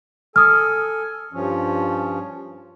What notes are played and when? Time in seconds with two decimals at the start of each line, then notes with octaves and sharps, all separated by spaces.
0.36 A4 G#5 D#6 F6
1.33 G2 F3 C#4